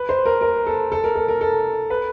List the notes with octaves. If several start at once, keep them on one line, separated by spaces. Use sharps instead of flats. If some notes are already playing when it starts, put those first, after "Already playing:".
Already playing: B4
C5
A#4
A#4
A4
A4
A#4
A4
A#4
A4
B4